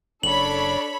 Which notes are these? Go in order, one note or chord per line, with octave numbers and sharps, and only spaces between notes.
F#1 D4 A4 C#5 B5 F#7